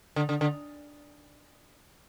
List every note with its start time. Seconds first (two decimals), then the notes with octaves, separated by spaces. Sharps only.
0.16 D3
0.29 D3
0.41 D3